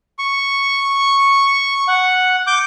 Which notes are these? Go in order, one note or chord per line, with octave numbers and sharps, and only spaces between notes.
C#6
F#5
D6 G6